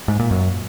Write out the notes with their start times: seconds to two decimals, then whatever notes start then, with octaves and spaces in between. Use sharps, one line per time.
0.08 G#2
0.20 A#2
0.31 F#2